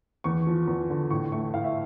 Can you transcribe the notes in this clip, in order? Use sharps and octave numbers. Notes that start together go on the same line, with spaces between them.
E2 C#6
F3
E2
D3
A2 C#6
A3 C#6
A2 F5
E5